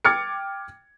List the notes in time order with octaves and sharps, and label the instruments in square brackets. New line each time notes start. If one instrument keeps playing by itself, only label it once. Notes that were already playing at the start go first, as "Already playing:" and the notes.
[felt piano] G5 D6 F6 G#6 A6 C#7